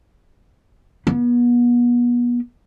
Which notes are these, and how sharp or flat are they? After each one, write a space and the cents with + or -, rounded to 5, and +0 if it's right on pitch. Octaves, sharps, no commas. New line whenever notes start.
B3 -35